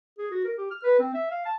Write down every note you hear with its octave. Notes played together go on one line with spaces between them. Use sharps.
G#4
F#4
A#4
G4
F6
B4
C4
E5
F5
A5